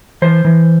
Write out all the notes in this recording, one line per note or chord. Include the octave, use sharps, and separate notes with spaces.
E3 C5
E3